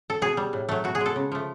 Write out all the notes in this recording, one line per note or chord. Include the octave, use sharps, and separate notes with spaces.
A4
B2 G#4
G3
A2
F#3 A3
B2 F#4
G#4
G#3
A4
C#3
F3 A3